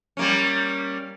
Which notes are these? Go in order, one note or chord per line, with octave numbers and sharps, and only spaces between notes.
G3 A#3 C#4